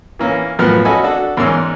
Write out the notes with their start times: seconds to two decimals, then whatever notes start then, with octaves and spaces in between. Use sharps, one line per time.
0.19 E3 A#3 C#4
0.59 F#2 A2 F3 B3 A#4 F6
0.85 C#4 F#4 A4 D#5 G#5 B5
1.04 D4 F#4 A4
1.37 E2 G#2 C#4 A#4 C6 E6